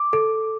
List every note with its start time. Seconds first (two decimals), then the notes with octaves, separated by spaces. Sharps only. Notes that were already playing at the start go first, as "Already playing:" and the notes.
Already playing: D6
0.13 A4